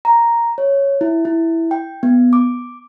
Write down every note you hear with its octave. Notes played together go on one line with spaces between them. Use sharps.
A#5
C#5
E4
E4
G5
B3
D6